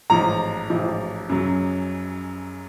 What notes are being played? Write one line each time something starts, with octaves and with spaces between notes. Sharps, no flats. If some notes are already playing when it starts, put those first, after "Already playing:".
A1 G#2 F3 A#5
A1 G#2 F3
F#2 C#3 F#3